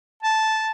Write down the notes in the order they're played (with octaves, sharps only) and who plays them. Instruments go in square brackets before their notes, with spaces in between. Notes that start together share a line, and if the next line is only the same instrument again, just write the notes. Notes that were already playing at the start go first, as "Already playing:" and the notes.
[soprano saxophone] A5